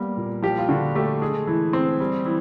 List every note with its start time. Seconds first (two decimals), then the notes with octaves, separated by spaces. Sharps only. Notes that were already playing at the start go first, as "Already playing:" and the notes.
Already playing: G3 A#3 B3
0.17 A#2
0.42 F3 G4
0.58 F4
0.69 D3 F#4
0.95 A3 G4
1.21 G#3 G#4
1.47 E3
1.73 C4
2.00 G3
2.25 E3